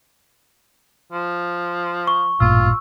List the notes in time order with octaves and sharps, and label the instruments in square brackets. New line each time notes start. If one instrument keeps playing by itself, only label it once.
[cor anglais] F3
[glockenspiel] C#6
[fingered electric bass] A1 G2 A#2 [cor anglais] F4 [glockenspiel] E6